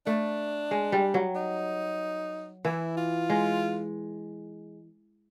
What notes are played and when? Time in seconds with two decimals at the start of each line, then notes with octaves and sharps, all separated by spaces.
0.06 A3 D4
0.71 G#3
0.92 G3
1.14 F#3
1.35 D#4
2.65 E3 E4
2.97 F4
3.30 G#3